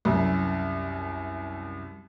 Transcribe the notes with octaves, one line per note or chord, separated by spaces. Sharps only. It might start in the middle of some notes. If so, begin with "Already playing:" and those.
C2 F#2